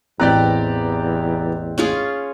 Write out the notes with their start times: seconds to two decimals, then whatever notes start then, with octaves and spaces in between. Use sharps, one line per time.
0.20 A1 E2 C4 G4 D5 A#5 F#6
1.78 C#4 F4 G#4